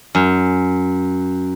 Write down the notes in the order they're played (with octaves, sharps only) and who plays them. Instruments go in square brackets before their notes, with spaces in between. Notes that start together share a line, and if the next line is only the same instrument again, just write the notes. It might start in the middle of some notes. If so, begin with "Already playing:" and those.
[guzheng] F#2